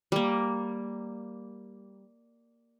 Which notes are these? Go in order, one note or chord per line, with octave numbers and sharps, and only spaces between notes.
G3 A#3